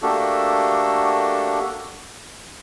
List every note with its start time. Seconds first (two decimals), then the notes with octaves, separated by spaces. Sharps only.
0.02 A3 A#3 D4 F#4 G4 A4